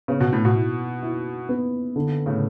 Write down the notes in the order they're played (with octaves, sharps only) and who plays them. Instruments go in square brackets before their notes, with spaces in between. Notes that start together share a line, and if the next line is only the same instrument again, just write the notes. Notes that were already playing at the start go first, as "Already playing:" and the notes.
[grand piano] C#3 [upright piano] B3
[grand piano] B2
A2
B2
[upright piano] E4
E4
B3
D3
[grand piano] A2 C#3